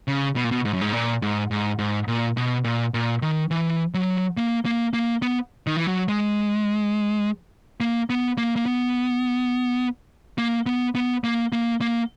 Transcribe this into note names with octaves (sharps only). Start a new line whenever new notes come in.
C#3
B2
A#2
B2
G#2
F#2
G#2
A#2
G#2
G#2
G#2
A#2
B2
A#2
A#2
D#3
E3
F#3
A#3
A#3
A#3
B3
D#3
E3
F#3
G#3
A#3
B3
A#3
A#3
B3
A#3
B3
B3
A#3
A#3
A#3